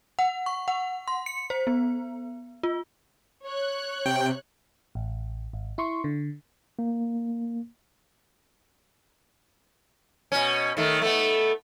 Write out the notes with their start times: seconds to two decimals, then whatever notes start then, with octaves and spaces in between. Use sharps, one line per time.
0.19 F#5
0.46 C#6
0.68 F#5
1.08 C6
1.26 C#7
1.50 C5
1.67 B3
2.63 F4
3.46 C#5 F#6
4.06 C3 G5
4.95 A1
5.53 G#1
5.78 E4 C6 C#6
6.04 D3
6.79 A#3
10.32 B2 C#4
10.77 D#3 A3
11.02 A3 B3